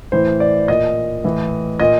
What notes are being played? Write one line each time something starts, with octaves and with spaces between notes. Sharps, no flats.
A2 E3 C5
D5
A#2 D#5
A2 E3
A#2 D#5